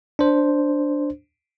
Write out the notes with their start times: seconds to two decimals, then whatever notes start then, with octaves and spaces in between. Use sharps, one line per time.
0.19 D4 C5